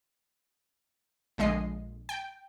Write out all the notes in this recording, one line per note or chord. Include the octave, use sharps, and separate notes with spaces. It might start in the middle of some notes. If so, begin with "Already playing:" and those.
A#1 D3 G#3 D#5 C7
G5